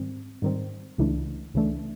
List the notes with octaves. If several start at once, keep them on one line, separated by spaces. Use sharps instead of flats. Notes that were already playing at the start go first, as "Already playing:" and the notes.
Already playing: G#2 D#3 G3 C4
G#2 D#3 G3 C4
C#2 C#3 E3 A3 D4
C#2 C#3 E3 A3 D4